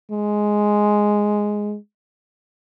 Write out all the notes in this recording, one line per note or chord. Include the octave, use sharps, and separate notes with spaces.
G#3